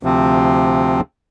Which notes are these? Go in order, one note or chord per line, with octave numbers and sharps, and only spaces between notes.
D2 C3 F3 C4